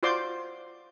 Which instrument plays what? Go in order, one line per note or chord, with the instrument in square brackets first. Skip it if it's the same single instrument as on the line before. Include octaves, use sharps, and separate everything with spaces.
[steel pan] F4 F#4 C5 D5 C6 D6